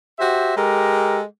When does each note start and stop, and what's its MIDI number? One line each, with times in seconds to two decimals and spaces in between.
0.19 0.52 66
0.19 0.52 67
0.19 0.52 72
0.19 0.52 76
0.57 1.22 56
0.57 1.22 67
0.57 1.22 69
0.57 1.22 70